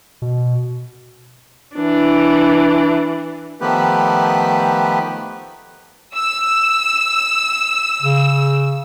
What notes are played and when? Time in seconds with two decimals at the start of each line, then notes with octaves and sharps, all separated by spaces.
0.22 B2
1.76 E3 D4
3.61 D#3 F3 A3 B3 G4 B4
6.16 E6
8.02 C#3